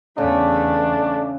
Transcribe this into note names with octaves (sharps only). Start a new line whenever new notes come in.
E2 C#3 A3 D4